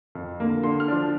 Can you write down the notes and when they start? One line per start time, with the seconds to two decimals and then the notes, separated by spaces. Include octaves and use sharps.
0.15 F2
0.40 D3 A#3
0.63 D3 C6
0.80 F6
0.88 F3 D4